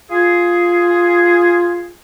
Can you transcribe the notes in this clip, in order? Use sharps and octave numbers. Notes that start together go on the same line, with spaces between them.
F4 G#4